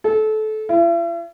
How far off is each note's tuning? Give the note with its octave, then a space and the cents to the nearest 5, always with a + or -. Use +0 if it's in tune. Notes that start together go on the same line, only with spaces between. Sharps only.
A4 -25
E4 +45